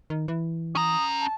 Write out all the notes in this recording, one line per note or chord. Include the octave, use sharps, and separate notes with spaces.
D#3
E3
C#4 A#5 D#6
A5